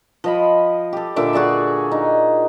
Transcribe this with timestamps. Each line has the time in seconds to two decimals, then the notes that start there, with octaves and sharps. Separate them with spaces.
0.24 F3 D#5 B5
0.93 G4 A4
1.16 A#2 D3 E5 D6
1.33 F#4 G#4 D5 E5
1.92 D#4